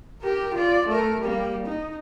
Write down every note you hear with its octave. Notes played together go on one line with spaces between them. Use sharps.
G4 A#4
F4 D5
A3 A#4
G3 A#3
D#4